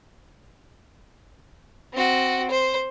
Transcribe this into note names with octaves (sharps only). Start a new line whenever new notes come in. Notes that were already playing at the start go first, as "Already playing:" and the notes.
C4 F#4
C5